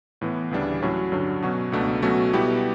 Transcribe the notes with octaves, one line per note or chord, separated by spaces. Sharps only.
A2 E3 B3
D2 C#3 E3 G3 D4
A2 F#3 C#4 F#4
G2 D3 F#3 C#4
B2 F#3 C#4 F#4
C#2 B2 A3 D4
B2 F#3 A3 C#4 F#4
B2 G3 B3 E4 G4